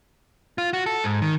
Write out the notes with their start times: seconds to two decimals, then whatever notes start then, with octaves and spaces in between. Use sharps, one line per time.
0.58 F4
0.73 F#4
0.86 A4
1.04 G#2
1.22 D#3